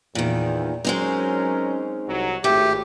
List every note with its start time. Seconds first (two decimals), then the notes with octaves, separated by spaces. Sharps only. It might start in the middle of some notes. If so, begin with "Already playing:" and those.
0.15 E2 A#2 D#3
0.85 F#3 G#3 C4 C#4 D#4 A#4
2.08 C2 F#3
2.44 G#1 A2 A3 G4